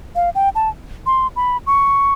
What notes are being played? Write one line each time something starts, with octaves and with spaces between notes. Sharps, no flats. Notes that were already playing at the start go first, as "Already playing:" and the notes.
F5
G5
A5
C6
B5
C#6